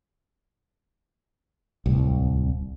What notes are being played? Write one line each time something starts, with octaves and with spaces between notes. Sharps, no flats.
D1 C2